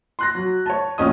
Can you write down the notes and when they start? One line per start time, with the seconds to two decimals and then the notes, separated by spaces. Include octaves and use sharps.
0.19 C6 F#6 A#6
0.35 F#3
0.66 C#5 A5
0.98 A#1 C#4 D#5 D#6